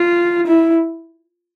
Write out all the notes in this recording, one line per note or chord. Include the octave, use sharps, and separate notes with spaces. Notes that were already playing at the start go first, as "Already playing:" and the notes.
Already playing: F4
E4